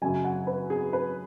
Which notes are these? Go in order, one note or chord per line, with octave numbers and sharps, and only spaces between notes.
F#2 C#3 F#3 G#5
F#5
B4
G#4
B4